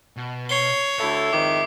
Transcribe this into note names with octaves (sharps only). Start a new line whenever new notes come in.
B2
C#5 C7 G7
D2 A4 E5 B5
F2 G#2 D#3 D6